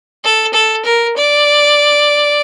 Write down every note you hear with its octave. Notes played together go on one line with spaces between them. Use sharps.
A4
A4
A#4
D5